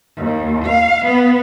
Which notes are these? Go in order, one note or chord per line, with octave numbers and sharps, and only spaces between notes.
D#2
F5
B3